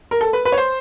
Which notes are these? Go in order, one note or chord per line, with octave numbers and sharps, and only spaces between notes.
A#4
A4
B4
B4
C#5
C5